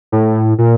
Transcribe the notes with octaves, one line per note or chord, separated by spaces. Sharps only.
A2
A#2